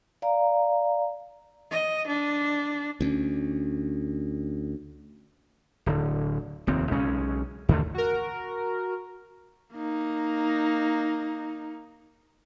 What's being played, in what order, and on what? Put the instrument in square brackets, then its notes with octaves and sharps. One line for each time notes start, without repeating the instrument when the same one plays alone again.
[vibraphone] D5 F5 A#5
[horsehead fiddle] D#5
D4
[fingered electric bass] D2 C4 C#4
[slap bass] D1 D3
F1 D#2 C4
B1 C#3 G#3 C#4
D#2 D3 A3
[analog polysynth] F#4 A#4
[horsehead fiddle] A#3 D#4